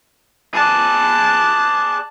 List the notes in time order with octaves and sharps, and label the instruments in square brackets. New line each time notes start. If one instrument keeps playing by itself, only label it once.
[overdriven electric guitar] G#4 D5 [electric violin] A5 F#6